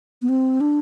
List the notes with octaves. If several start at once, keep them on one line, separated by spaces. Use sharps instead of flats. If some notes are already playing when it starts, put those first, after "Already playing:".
B3
C4
D4